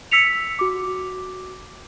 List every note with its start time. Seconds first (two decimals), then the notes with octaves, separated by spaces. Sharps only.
0.11 E6 B6 C#7 F7
0.59 F#4 D6